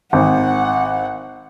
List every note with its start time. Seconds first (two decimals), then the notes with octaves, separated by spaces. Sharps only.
0.13 G#1 F#5